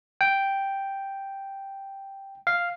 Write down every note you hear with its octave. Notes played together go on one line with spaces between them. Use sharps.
G5
F5